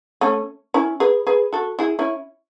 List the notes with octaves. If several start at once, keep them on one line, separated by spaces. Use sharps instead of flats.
A3 C#4
C#4 E4
G#4 B4
G#4 B4
F#4 A4
E4 G#4
C#4 E4